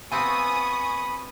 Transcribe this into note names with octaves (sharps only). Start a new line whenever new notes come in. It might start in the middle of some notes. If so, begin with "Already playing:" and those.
B3 C4 F4 G#5 B5 C#6 D#6